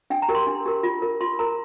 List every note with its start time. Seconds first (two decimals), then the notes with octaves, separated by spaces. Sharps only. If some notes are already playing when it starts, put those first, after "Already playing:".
0.10 D4 G5
0.22 A#5
0.29 G4 A#4
0.35 C6
0.47 D4
0.66 G4 A#4
0.83 F4
1.02 A#4
1.21 F4 C6
1.39 A#4 A#5